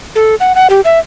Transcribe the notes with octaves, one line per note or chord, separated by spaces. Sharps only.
A4
F#5
F#5
G4
E5